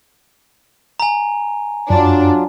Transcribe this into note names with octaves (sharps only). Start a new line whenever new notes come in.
G#5 A#5
F#2 F#3 D4 F4